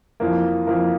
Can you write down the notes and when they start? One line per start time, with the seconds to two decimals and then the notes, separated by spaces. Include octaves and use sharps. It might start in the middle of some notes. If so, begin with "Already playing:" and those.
0.20 F2 E3 A#3
0.67 F2 E3 A#3